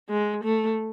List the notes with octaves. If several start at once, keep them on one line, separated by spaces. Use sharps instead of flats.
G#3
A3